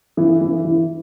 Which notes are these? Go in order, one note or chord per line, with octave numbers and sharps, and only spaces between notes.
E3
E3
E3